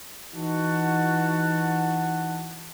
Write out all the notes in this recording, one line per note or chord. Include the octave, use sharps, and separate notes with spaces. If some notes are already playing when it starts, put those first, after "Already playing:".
E3 D#4 F#4 F#5 A5